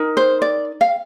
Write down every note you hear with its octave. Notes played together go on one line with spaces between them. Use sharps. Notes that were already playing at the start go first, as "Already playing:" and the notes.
Already playing: D#4 A#4
C5
D5
F5